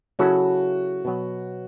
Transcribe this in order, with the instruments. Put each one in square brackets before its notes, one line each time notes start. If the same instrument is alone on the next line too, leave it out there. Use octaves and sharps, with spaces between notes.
[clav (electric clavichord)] C#3 F#3 C#4 E4 A4 [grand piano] F#4
[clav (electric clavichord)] B2 F#3 B3